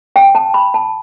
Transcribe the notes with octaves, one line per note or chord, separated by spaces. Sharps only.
G5
A5
B5
A5